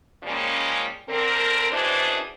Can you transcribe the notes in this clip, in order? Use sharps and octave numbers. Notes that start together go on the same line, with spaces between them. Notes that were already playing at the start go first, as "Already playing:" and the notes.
C#3 F3 G3 G#3 A#3 C#4
D3 C4 A#4
F#2 B2 E3 D4 G#4 C5